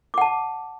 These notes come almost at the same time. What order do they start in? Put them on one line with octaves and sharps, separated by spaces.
D6 F#5 A5